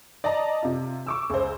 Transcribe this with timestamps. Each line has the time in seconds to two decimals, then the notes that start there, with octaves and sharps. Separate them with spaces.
0.24 D5 D#5 A5 A#5
0.63 C3 F4
1.07 C#6 D6 E6
1.30 C#2 C5